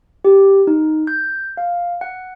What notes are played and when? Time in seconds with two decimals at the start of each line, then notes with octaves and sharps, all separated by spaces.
0.25 G4
0.67 D#4
1.07 G6
1.57 F5
2.01 F#5